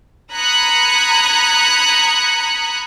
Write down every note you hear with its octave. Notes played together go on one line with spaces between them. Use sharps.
A#5 B5 D#6 F#6 G#6 C#7